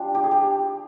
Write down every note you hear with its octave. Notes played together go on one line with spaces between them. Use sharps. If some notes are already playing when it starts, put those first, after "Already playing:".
Already playing: G3 D4 F4
G4
G#4
G4